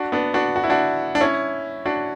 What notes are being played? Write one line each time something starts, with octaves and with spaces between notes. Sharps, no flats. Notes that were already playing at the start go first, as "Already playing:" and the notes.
Already playing: D4 F#4
B3 D4
D4 F#4
F#4
E4
D4 F#4
D4
C#4 E4
D4 F#4